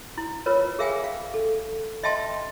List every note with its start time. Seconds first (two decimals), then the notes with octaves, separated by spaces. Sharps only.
0.18 E4
0.46 F4 A#4 B4 C#5
0.79 G#4 A#4 E5 F5 G5 G#5
1.04 F5
1.34 A4
2.03 D#5 E5 G5 A5 C6